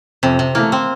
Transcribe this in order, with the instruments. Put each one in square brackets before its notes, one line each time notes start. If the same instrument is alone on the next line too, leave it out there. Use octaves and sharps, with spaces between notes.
[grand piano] F2 [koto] C3
[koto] C3
[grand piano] E3 A3 [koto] A#3
[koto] C4